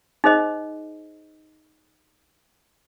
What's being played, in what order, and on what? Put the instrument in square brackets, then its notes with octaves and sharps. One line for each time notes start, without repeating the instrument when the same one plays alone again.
[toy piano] D#4 G#4 C5 D#5